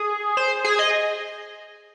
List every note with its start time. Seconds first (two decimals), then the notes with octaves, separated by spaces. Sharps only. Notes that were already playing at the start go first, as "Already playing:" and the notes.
Already playing: G#4
0.37 C5
0.65 G#4
0.79 D#5